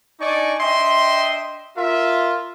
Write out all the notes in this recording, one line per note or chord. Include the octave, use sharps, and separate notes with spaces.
D4 D#4 D5 D#5 G#5 C#6
D4 D#5 E5 G5 C6
F4 A#4 E5